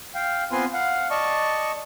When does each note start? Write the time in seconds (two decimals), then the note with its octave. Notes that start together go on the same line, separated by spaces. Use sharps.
0.14 F5 G5
0.52 B3 C4 F4 B4 G#5 C6
0.73 F5 F#5
1.10 D5 D#5 A5 C#6